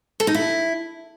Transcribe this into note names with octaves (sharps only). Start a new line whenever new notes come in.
A4
D#4
E4